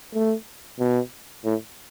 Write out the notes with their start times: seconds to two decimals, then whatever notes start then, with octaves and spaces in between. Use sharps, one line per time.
0.14 A3
0.79 B2
1.45 A2